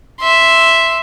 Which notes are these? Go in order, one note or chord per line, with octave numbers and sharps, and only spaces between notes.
E5 C6